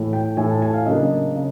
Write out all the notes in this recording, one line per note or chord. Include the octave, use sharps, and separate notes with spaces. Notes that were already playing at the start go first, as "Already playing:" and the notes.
Already playing: A2 E3 A3
G5
A2 E3 A3 G#5
A5
G#5
F5
C#3 F#3 A#3 D4 D#5
C#3